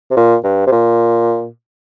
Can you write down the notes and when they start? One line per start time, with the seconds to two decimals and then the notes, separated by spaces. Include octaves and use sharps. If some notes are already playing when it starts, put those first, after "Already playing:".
0.11 C3
0.17 A#2
0.44 G2
0.67 C3
0.72 A#2